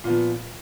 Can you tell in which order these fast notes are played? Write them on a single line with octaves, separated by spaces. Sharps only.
A#2 B3 F3